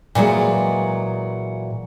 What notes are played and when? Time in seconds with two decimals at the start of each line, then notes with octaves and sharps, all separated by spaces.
0.15 A#2 E3 F#3 G#3